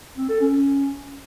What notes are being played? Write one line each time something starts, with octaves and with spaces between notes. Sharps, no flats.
C4
A4
C#4